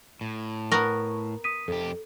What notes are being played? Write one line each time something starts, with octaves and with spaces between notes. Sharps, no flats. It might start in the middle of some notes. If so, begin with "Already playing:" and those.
A2
B3 A#4 C#6
D#6 B6 D#7
F2 G4 A4